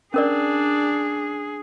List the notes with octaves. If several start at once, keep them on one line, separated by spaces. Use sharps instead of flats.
C#4 D4 G#4 A#4 D5